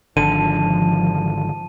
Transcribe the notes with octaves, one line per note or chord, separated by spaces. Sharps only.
G#1 D3 F3 A5 D#7